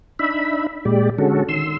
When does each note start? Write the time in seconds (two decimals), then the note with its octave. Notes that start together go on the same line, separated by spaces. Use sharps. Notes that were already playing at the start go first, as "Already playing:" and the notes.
0.19 D4 D#4 E5 B5
0.85 A#2 G#3 G4 D5
1.18 D3 G#3 C#4 F#4 A4
1.49 D#3 C6 E6